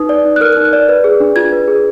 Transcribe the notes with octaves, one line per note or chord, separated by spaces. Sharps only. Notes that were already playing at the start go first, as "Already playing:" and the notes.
Already playing: D#4 B4 D#6
D5
D#4
F#6
A#4 F6
F#6
D#4
F#6
D5
B4
G#4
D4
F4 G#6
B4
G#4